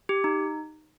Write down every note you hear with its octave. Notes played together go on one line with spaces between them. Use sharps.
G4
D#4